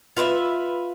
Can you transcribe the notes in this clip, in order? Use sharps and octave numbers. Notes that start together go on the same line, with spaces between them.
F4 B4 D5 E5